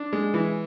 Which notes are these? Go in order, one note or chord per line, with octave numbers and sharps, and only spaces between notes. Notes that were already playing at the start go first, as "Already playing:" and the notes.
Already playing: D4
G#3
E3